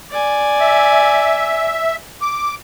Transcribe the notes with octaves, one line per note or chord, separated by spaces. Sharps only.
D5 G#5
E5
D6